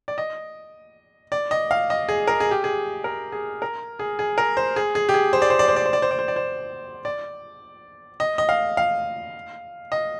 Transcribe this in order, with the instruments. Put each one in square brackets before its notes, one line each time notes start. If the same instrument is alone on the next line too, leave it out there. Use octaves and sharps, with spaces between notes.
[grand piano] D5
D#5
D5
D#5
F5
D#5
G#4
A#4
G#4
G4
G#4
A#4
G#4
A#4
G#4
G#4
A#4
C5
G#4
G#4
G4
G#4
C5
D5
C5
D5
C5
D5
C5
D5
C5
D5
C5
D5
C5
D5
D#5
D#5
F5
F5
D#5